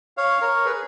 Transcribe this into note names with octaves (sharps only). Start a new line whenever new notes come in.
C#5 F5
A#4 C#5
G#4 B4